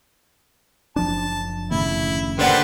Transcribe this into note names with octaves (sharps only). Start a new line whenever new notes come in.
F#1 F3 D4 A5
D#2 A2 C#3 E4
D3 A#3 G4 B4 C5 D5 F#5